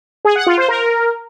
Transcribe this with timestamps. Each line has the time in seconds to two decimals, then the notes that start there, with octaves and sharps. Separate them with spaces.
0.25 G#4
0.36 F#5
0.47 F4
0.58 C5
0.68 A#4